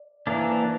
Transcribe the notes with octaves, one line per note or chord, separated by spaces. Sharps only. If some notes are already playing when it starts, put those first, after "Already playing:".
Already playing: D5
E3 A#3 D4 E5
C5
D5
D5